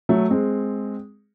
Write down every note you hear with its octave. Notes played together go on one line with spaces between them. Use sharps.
F#3 A3
G#3 C4